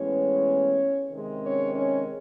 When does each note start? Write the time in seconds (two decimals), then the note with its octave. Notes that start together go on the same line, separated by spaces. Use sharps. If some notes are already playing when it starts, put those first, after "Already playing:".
Already playing: A2 E3 G#3 B3 C#4 C#5
1.11 C3 D#3 G#3
1.42 C#4 C#5
1.73 C#4 C#5